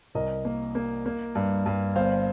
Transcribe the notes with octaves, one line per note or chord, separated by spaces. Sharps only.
C2 A#4 D#5
A#3
A#3
A#3
G2
G2
G1 C5 F5